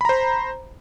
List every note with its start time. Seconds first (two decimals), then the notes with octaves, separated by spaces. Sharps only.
0.01 B5
0.05 A#5
0.09 C5